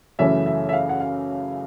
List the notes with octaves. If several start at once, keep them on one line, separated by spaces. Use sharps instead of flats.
F#2 C#3 E3 A3 C#4 E5
E5
E5
F5
F#5
F5